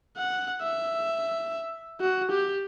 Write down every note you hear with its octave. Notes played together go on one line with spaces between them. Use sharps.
F#5
E5
F#4
G4